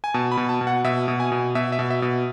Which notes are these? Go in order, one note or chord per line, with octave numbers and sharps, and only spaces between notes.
G#5
B2 A5
B5
B2
A5
B2
F#5
B2 E5
B2
G#5
B2
B2 E5
E5
B2
E5
B2